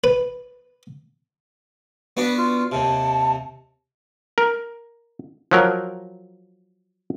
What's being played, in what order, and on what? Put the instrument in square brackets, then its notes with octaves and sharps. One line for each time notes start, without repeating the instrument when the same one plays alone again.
[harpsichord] B4
[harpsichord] B3 D4 F#4 [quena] B4
[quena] F4
[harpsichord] D#2 C3 [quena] A5
[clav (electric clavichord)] A#4
F3 F#3 A#4